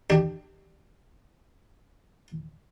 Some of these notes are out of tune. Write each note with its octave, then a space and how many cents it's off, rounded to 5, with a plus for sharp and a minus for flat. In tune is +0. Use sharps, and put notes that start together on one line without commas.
D4 +30 G4 -10